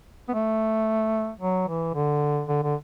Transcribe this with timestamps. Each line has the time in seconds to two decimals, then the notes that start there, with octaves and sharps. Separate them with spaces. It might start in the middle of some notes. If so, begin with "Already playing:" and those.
0.29 B3
0.34 A3
1.40 F#3
1.68 E3
1.94 D3
2.48 D3
2.63 D3